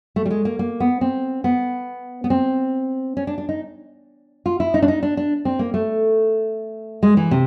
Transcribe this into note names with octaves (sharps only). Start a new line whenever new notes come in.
A3
G3
G#3
A#3
A#3
B3
C4
B3
B3
C4
C#4
D4
D4
D#4
F4
E4
D#4
D4
D#4
D4
D4
C4
A#3
A3
G#3
E3
C3